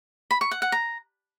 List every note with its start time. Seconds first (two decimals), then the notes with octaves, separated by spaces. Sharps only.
0.31 B5
0.41 C#6
0.51 F#5
0.62 F#5
0.72 A#5